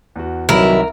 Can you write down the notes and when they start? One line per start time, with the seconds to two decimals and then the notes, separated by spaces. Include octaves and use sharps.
0.16 E2 F#4
0.49 C2 C3 D#3 E3 F#3 E4 A#4